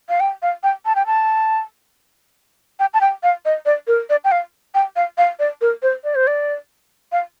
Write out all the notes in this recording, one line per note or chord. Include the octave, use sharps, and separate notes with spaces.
F5
G5
F5
G5
A5
G5
A5
G5
A5
G5
F5
D#5
D5
A#4
D5
G5
F5
G5
F5
F5
D5
A#4
C5
D5
C5
D5
F5